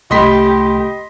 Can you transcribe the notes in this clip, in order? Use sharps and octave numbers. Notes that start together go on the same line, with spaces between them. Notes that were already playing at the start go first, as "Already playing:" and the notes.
C2 A3 G4 D#5 B5 C6 B6